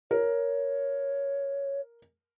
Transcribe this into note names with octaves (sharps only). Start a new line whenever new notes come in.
A#4 C#5